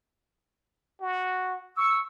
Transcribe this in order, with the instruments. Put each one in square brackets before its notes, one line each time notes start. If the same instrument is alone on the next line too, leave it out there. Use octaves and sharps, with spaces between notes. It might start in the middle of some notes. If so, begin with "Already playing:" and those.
[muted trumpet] F#4
[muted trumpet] C#6 [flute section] E6